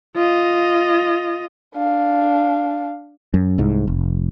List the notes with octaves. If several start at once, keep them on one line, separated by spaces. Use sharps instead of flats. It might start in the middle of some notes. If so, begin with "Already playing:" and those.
F4 D#5
D4 F5
F#2
C2 G#2
F1